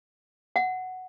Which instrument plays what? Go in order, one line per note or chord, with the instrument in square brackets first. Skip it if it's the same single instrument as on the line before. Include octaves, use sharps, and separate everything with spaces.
[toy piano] F#5